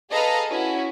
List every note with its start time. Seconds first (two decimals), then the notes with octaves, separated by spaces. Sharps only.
0.11 G#4 A4 B4 D#5 F5 A#5
0.50 C#4 E4 F#4